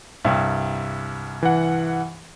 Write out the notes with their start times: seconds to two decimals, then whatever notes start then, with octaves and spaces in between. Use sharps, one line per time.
0.24 C2 G2
1.43 E3 F#5